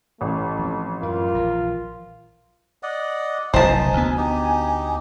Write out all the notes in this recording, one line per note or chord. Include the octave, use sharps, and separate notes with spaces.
A1 A3
F3 C4
F#2 F4 A#4
A#1 E3 F3
D5 D#5 F#5
F1 B1 C#3 D#4 C5 G#5 A5
D2 B3
D#4 G4